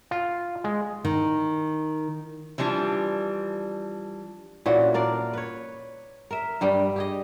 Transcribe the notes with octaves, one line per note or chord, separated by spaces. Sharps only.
F4
G#3
D#3
E3 F3 G3 D4
A#2 E3 C#4 F#4
D4 A#4 D5 F5
B4 C#5
A#4 E5
G2 G3 G5
G4 G#4 D#5